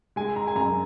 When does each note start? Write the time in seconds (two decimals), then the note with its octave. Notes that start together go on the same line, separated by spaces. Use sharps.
0.16 G#3 G#5
0.36 A#5
0.47 G#5
0.56 F#2 A#5